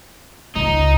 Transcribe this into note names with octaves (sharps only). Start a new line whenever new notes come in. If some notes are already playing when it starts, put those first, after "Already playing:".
C#2 D#4